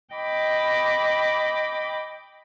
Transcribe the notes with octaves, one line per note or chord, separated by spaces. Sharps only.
D#5 G5 B5 D6